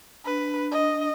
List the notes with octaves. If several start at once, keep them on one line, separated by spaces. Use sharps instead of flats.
D4 B4
D#5